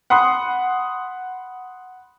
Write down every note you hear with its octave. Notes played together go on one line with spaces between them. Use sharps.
F#5 B5 C6 D#6 F#6